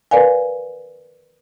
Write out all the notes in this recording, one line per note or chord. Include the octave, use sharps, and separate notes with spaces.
A#4 B4 D5 F5 G#5